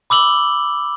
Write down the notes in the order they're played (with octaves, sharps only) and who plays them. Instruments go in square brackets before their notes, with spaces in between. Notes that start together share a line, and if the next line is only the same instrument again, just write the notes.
[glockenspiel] B5 D6 E6 F#7 G7